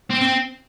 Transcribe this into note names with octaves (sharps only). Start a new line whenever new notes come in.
C4
C4